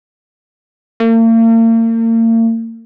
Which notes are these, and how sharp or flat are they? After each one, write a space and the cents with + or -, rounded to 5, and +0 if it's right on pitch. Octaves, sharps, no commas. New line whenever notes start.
A#3 -40